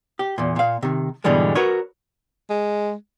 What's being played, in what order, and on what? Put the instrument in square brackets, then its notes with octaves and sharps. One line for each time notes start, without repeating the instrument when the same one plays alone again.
[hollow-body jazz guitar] G4
E2 A#2
A#2 F5
C3 D#3
G#2 B2 D3 E3 G3 G#3
F#4 A#4 B4 C#5
[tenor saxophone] G#3